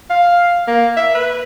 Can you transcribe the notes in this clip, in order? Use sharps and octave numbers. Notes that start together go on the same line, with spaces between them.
F5
A#3
E5
B4